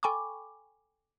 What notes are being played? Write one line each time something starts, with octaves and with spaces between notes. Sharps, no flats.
A4 G5 G#5 B5 C#6 D6